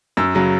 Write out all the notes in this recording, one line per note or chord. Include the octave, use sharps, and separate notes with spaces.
F#2 E6
C#3 F#3